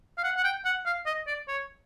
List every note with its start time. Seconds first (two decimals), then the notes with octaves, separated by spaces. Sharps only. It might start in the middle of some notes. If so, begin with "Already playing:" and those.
0.18 F5
0.24 F#5
0.37 F#5
0.44 G5
0.65 F#5
0.86 F5
1.06 D#5
1.27 D5
1.48 C#5